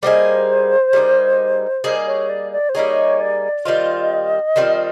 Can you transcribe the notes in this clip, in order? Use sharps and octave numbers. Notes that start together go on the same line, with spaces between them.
G3 A#3 D#4 G#4 C5
G3 A#3 D#4 G#4
G3 A#3 D#4 G#4
C#5
D5
D5
C5
G3 A#3 D#4 G#4 C#5
D5
D#3 G3 C4 F4 D#5
D#3 G3 C4 F4